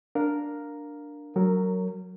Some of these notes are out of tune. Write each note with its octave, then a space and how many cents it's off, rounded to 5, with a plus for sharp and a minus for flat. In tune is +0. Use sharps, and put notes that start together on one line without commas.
D4 +0 A#4 +0 F5 +0
F#3 +10 A#4 -20